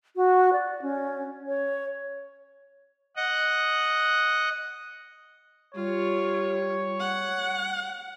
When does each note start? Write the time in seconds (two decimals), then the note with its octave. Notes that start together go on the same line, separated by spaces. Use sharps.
0.16 F#4
0.53 D5
0.82 C#4
1.47 C#5
3.16 D#5 F#5
5.75 G3 F4 C#5
7.00 F#5